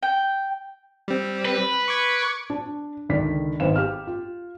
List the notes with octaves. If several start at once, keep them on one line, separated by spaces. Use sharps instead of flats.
G5
G3 C4
B4
C#6 D6 G#6
D4
C#2 D3 D#3 D5 B6
G#1 B3 C5 F5 E7
G4 F6
F4